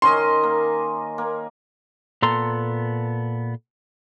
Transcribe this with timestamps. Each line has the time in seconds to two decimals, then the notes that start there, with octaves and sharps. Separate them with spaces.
0.02 D#3 C#4 D#5 C6
0.43 A#3
1.18 A#3
2.22 A#2 B3 A4 A#5 C6